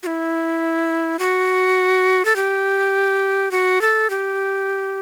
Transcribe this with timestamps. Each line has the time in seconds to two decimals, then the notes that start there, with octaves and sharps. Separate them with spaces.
0.03 F#4
0.07 E4
1.19 F#4
2.25 A4
2.36 G4
3.51 F#4
3.81 A4
4.10 G4